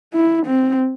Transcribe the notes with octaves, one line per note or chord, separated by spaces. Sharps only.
E4
C4